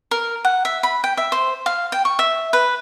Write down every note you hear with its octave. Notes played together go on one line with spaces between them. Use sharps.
A#4
F#5
E5
B5
G5
E5
C5
F5
G5
C#6
E5
B4